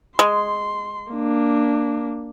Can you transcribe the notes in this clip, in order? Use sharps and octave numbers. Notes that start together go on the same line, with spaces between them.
G#3 C6
A#3 D4